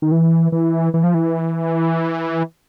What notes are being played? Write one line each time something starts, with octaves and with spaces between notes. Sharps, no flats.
D#3
E3
E3
E3
F3
E3